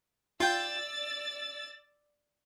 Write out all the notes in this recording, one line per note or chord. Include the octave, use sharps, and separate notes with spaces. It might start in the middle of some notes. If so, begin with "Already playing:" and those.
F4 D5 G5 E6 A6